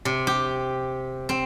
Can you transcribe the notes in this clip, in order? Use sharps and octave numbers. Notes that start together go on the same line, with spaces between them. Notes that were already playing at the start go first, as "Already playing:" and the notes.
C3
G4
C4